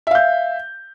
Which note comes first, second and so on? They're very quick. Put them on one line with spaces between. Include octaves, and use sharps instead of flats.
E5 F5 G6